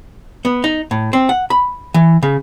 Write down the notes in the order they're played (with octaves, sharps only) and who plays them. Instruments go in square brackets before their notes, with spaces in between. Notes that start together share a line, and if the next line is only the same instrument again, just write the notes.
[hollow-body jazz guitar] B3
D#4
A2
C4
F#5
B5
E3
C#3